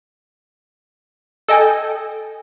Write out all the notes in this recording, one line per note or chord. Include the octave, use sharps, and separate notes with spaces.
A4 D#5 G5 G#5